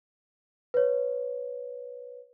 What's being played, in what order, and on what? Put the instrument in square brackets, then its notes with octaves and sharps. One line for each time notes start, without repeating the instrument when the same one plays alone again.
[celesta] B4 C#5